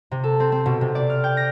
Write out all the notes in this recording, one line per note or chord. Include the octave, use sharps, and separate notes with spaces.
C3
A4
C4
C4
B2
C3
D5
F6
G5
A#6